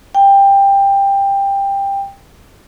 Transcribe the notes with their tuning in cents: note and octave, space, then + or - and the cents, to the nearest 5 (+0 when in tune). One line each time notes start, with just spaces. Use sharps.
G5 +15